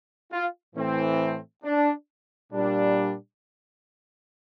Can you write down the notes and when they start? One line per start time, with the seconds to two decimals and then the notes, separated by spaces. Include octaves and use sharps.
0.32 F4
0.75 A2 E3 A3 C4
1.63 D4
2.52 A#2 G3 D4